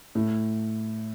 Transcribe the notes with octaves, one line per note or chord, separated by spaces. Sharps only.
A2